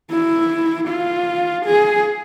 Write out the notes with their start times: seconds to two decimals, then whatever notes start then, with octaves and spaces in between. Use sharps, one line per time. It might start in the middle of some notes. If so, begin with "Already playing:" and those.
0.11 E4
0.88 F4
1.66 G#4